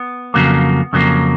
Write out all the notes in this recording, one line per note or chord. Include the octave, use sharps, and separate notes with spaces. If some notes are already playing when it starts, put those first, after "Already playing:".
Already playing: B3
F2 C#3 F#3 A#3
F2 C#3 F#3 A#3